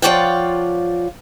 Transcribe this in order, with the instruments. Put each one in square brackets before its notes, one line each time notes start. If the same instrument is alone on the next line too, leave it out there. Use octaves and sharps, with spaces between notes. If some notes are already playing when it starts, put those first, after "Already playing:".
[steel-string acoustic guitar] F3 F4 C#5 D5 F#5 G5